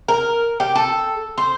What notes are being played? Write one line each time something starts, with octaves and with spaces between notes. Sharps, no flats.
A#4
G4
A4
C5